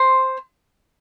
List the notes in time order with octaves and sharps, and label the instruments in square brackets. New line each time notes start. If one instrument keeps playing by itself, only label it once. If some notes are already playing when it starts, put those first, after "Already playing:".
Already playing: [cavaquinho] C5 C6